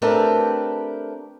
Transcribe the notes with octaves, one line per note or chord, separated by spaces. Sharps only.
A3 C4 D4 G4 A#4 B4